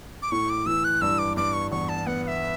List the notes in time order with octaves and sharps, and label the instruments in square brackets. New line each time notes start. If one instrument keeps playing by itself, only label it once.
[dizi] D6
[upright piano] A2 [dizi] C#6
[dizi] D6
[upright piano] E3 [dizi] E6
[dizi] F#6
[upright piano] G2 [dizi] E6
[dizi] D6
[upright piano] G2 [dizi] D6
[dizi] C#6
[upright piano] E2 [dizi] C#6
[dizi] A5
[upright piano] B3 [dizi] F#5
[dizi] F#5
E5